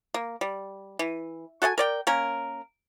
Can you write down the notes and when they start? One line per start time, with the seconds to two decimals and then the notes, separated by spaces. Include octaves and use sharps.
0.14 A#3
0.41 G3
0.99 E3
1.62 F#4 A4 F5 G#5
1.78 A#4 D5 G5
2.07 A#3 C#4 A#4